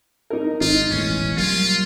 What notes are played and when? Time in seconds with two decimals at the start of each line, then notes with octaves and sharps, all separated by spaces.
0.30 D#4 A#4
0.61 G#1 D#4 F4
0.91 E1 A1 E2 C#4
1.37 F#3 G3 A#3 F4